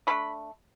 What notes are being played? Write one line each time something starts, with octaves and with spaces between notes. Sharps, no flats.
B2 A3 D4 B5